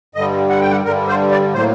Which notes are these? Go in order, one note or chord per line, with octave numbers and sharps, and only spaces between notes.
G2 D3 G3 D#5
F#5
G5
F#5
G2 D3 G3 A#4
C5
D5
A2 F#3 A#3 C5